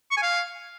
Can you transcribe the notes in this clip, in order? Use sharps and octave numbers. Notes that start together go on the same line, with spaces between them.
C#6
G#5
F5